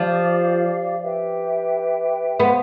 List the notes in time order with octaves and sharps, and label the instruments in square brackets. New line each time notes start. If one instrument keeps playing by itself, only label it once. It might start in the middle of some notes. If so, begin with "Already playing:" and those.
Already playing: [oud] F3 [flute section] G4 D5 F5
[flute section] G4 B4 E5 G5
[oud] B3 [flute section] C5 F5 C6